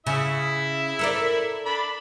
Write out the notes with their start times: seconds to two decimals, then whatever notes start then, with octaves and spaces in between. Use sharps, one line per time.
0.07 C#3 E4 E5
0.99 A4 A#4 D5
1.65 D4 B5